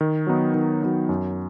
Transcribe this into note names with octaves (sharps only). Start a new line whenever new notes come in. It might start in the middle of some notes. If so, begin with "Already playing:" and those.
D#3
F#3 B3 D#4
D#3
F#3 B3 D#4
F#2